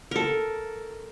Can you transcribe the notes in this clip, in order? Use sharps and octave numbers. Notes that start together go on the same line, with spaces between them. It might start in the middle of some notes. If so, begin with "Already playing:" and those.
A4 A#4